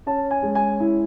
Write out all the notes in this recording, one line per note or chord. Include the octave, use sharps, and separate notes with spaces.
C#4 A5
G#5
G#3
G#5
E4